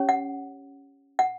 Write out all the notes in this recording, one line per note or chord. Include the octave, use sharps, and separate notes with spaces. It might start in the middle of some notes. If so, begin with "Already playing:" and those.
Already playing: C#4 G4 C#5
F#5
F#5